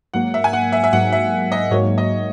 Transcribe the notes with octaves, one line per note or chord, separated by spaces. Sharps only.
G#2 F#3 A#3 F#5
E5
G#5
F#5
E5
E5
G#2 F#3 A#3 F#5
E5
D#5
G#2 F#3 A#3 C#5
D#5